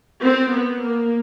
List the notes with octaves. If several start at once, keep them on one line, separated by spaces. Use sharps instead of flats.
C4
B3
A#3